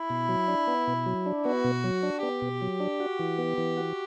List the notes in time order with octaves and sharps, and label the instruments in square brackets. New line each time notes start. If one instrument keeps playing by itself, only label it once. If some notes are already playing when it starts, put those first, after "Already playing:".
Already playing: [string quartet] E4
[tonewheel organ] B2
F#3
D4
B3
B2
F#3
D4
[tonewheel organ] B3 [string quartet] F#4
[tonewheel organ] B2
F#3
D4
[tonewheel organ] B3 [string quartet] G4
[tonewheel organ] B2
F#3
D4
F#4
E3
B3
E3
F#4